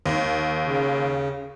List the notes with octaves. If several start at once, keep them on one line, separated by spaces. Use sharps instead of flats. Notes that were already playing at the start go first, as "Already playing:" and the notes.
D#2
C#3